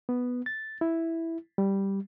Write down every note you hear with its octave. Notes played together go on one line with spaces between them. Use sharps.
B3
A6
E4
G3